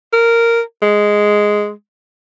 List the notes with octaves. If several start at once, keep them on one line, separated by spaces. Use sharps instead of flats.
A#4
G#3